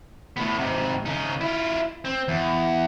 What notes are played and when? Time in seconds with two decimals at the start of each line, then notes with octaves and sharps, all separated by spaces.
0.37 A2 B3
0.58 G#2 C3
1.06 C#3 D#4
1.41 E4 F4
2.05 C4
2.28 E2